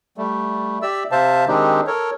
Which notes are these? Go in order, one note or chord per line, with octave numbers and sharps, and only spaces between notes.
G3 A3
G4 D5 E5 E6
C3 C5 E5 F5 A5
D#3 G#3 C4 D4 D#4 G4
A4 A#4 C#5